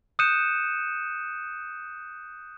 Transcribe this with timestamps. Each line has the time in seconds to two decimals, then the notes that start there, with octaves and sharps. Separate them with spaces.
0.19 D#6 F#6 G6 C#7 D#7 E7